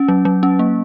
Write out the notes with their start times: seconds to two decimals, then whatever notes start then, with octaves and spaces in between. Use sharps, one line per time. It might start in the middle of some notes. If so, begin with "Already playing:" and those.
Already playing: C#4
0.08 F#3
0.25 F#3
0.43 C#4
0.59 A#3